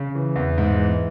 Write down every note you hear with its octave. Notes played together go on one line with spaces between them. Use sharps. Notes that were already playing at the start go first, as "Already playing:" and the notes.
Already playing: C#3
E3
E2
G#2
E3